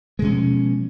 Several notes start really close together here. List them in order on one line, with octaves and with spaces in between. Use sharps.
G#3 B2 C#4 F3